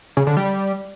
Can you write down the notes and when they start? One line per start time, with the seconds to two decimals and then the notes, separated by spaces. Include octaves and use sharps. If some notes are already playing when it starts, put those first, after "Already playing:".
0.17 C#3
0.27 D3
0.37 G3